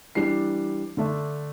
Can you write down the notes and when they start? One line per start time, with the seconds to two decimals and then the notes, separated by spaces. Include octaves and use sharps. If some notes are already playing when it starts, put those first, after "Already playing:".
0.15 E3 G3 D4 C7
0.97 D3 A3 D4